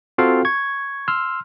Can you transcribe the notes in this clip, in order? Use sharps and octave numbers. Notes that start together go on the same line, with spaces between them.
C4 F4 F#4 A4 F5 G5
C#6 G#6
C6 E6 F6